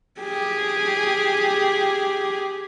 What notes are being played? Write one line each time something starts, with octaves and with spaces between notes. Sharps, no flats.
G4 G#4